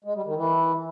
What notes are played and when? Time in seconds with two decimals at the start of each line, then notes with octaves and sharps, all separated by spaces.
0.04 G#3
0.15 G3
0.25 D#3
0.36 E3